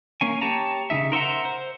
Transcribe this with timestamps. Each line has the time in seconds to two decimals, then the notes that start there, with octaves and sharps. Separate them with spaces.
0.21 A#3 C#4 G#5
0.41 G4 C#5 A5 A#5
0.90 C#3 G3 D#4 E5
1.12 A#4 C5 E5 F#5 A#5
1.45 C5